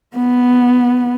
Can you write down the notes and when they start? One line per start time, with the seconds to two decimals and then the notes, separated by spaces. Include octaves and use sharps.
0.16 B3